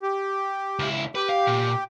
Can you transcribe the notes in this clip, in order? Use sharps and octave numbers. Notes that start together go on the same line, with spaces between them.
G4
C#2 E4
G4 B4
F5
A#2